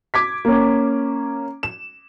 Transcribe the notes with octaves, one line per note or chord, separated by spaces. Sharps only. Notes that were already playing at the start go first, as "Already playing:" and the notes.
D6 G#6 B6
A#3 C#4
E7